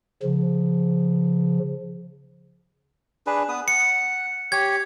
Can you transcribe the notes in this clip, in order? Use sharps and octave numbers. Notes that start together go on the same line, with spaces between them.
C#3 F3
D4 G#4 B4
B3 B4 D#6
F#5 C#7
G4 C#5 G#6